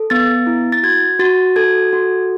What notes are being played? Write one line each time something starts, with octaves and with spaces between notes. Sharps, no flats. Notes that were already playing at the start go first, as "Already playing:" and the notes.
Already playing: A4
B3 A6
E4
A6
F#4 G#6
F#4 A6
A4 G#6
F#4